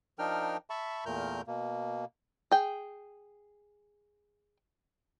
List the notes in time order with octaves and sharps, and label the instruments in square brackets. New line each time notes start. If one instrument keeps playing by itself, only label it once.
[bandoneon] F3 D4 D#4 A#4 G5 F6
E5 A5 B5 C#6
E2 A#2 A3 A#4 F6 G6
B2 A#3
[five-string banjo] G#4 G5